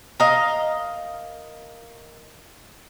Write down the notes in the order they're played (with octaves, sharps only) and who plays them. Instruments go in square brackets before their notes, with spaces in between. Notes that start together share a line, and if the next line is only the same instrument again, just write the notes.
[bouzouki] A#4 D#5 F5